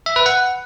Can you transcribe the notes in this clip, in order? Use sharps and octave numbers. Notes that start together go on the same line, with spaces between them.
E5
B4
F#5